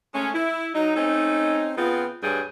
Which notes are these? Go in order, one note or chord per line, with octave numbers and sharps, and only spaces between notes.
G#3 A3 C#4
E4
F#3 D#4
A3 C4 C#4 D#4
C#3 B3 C4 F4
D2 G2 G3 G#4 C#5